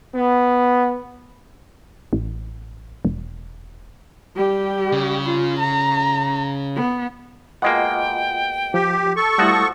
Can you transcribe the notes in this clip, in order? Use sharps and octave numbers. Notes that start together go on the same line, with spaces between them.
B3
A1
E1
G3 G4
C#3
F4
A#5
B3
B2 G#3 A#3 F4 D#5 F#5 G5
F3 G4
A4 C#6
F3 G3 A3 E4 F#4 F#5 D#6